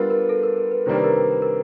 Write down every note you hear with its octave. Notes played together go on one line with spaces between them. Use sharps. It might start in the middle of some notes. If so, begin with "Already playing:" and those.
Already playing: G3 B3 D4 F4 A#4 B4
A#4
A4
A#4
A#4
B4
C3 D#3 G3 A#3 D4 C5
B4
A#4
B4
A#4